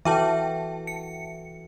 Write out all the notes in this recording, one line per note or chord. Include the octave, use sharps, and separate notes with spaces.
E3 F#4 A4 E5 G5 A5
C#7